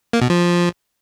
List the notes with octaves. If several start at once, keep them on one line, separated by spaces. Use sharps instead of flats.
A#3
B2
F3